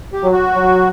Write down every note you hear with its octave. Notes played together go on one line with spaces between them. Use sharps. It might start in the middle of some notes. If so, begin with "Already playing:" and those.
G4
F#3
F#4
F#3